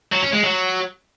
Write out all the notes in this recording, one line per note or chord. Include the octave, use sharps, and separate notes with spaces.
F#3
C#4
G#3
F#3